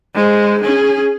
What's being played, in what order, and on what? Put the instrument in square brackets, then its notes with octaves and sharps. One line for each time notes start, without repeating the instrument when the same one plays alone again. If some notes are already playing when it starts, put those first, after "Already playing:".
[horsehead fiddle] G#3 C5
C#4 G#4